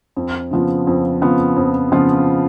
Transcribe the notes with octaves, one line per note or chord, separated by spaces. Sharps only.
F2
C#3 F3 B3 F4
F2
C#3 F3 B3 F4
F2
C#3 F3 B3 F4